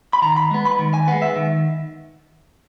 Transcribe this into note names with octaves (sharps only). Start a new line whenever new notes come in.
B5
D#3 A#5
B5
G#3 B3
B5
D#3
G#5
G#3 B3 F#5
E5
D#3